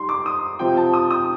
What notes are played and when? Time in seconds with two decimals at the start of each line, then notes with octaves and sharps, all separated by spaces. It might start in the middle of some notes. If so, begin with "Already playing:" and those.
Already playing: G3 D#4 C6
0.09 D6
0.26 D#6
0.59 C3 F3 C4 F4 G5
0.77 A5
0.94 D#6
1.11 D#6